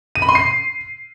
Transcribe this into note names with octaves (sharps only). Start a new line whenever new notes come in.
D#7
B5
C6
C7